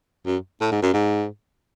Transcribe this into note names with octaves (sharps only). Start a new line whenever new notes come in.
F#2
A2
G#2
F#2
G#2